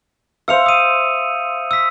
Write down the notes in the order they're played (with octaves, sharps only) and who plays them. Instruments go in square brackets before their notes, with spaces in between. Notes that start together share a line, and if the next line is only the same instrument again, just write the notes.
[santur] C5 E5 F5 [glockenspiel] E6 C#7 F7
[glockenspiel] D#6 D#7
E6 B6